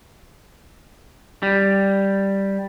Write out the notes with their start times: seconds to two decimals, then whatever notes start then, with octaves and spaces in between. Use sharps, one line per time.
1.43 G3